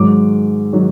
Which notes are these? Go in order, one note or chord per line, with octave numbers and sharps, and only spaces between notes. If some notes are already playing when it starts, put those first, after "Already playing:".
Already playing: G#2 D#3 F#3 D6
D#3 F#3